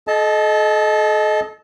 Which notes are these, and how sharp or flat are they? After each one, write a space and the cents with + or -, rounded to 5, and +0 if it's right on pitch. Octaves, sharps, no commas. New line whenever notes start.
A4 -35 D#5 +0 A5 +0